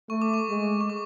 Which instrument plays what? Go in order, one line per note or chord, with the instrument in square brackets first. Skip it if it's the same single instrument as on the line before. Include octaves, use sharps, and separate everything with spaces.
[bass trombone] A3 [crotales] C#6
[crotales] D6
C#6
[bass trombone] G#3
[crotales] C#6
D6